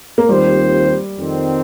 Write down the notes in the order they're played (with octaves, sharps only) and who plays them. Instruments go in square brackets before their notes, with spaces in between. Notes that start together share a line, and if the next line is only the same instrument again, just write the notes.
[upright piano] A#3
[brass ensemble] D#2 D#3 C4 F4 C5 [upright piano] G3
[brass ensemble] F2 D#3 C4